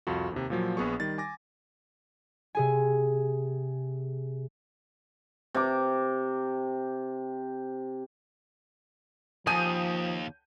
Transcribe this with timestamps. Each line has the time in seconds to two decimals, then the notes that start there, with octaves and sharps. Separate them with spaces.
0.07 C2 F2 F4 F#4
0.32 D#2 C3
0.50 A#2 F3 F#3
0.77 A#1 B3 G#4 C#6
1.00 D#3 G3 A6
1.18 G#5 D6 A6 A#6
2.55 C3 G#4 G#5
5.55 C3 D6
9.47 D#2 F3 G#5 D#6 G6 D#7